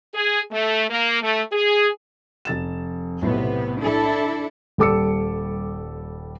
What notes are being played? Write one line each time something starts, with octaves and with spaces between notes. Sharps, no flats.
G#4
A3
A#3
A3
G#4
F1 A6 E7
B1 A2 C3 B3
D4 E4 A4
D#1 G3 A4 D6 E6 C#7